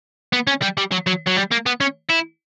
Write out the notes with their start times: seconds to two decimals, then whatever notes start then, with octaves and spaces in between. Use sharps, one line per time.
0.33 B3
0.47 C#4
0.62 G3
0.77 G3
0.91 F#3
1.07 F#3
1.26 F#3
1.36 G3
1.51 A#3
1.66 B3
1.81 C#4
2.10 E4